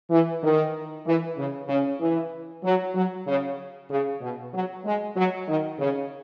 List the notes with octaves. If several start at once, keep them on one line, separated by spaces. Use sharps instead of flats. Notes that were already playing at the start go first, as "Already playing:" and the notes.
E3
D#3
E3
C#3
C#3
E3
F#3
F#3
C#3
C#3
B2
F#3
G#3
F#3
D#3
C#3